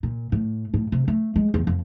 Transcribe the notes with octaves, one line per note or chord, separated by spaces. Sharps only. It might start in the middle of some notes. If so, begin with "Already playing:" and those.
A#2
A2
A2
C3
A3
G#3
E2
F2